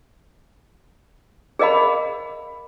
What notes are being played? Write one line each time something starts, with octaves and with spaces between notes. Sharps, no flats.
G#4 A#4 D#5 F5 B5